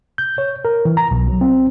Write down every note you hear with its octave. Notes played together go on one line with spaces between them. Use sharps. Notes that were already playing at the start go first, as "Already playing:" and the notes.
G6
C#5
A#4
E3
A#5
B1
F#3
C4